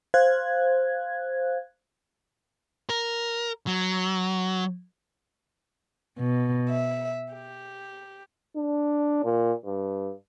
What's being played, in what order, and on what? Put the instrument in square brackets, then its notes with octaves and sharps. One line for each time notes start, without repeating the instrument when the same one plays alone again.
[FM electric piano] C5 F5 F#6 G#6
[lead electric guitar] A#4
F#3
[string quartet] B2
E5
G4
[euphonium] D4
A#2
G2